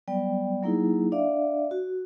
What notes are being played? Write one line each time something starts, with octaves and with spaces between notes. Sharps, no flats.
F#3 G3 B3 D5 G5
F#3 A#3 D#4 E4 G#4
D4 D5 E5 F5
F#4